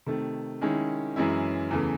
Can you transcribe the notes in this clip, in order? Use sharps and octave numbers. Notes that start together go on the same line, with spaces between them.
C3 D#3 A3
D#3 G#3 C#4 E4
F#2 E3 G#3 C#4 E4
E2 C#3 E3 A3